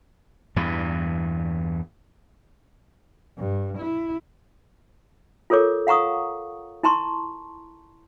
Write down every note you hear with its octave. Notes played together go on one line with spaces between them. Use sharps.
E2 G2 E3
G2
E4
F4 A4 A#4 C#5 D6
F5 F#5 A#5 C#6 D#6
E4 A5 A#5 C6 C#6